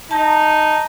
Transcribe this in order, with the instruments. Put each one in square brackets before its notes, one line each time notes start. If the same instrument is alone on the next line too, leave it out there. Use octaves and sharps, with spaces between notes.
[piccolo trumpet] D#4 [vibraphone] A5